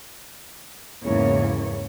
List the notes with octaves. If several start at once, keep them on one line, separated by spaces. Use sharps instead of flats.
E2 G#2 C#3 E3 A#3 C#5